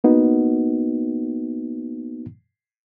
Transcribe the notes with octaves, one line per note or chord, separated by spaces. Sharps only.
A#3 B3 D#4 F#4